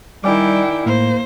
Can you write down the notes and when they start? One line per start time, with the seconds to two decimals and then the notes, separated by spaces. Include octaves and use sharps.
0.24 D#3 G3 E4 D5 G5 G#5 D6
0.86 A2 A#3 C5